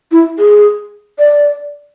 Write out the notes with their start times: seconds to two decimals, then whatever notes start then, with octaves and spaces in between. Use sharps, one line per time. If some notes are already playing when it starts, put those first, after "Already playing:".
0.12 E4
0.39 G#4
1.19 D5